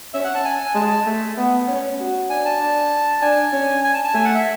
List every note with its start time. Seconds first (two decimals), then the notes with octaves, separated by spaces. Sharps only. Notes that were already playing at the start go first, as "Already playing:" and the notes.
0.14 C#4 E5
0.24 F#5
0.35 A5
0.45 G#5
0.75 G#3 A5
1.06 A3
1.37 B3
1.67 C#4
1.99 F#4
2.30 D4 G#5
2.45 A5
2.60 D4
3.22 D4 G#5
3.53 C#4
3.84 G#5
3.94 A5
4.04 A5
4.14 A3 G#5
4.25 F#5
4.35 E5